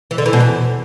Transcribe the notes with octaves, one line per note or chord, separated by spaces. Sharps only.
E3
D3
E3
B2
E2